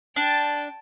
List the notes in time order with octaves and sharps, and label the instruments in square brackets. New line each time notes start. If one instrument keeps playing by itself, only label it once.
[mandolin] D4 [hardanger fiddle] G5 A5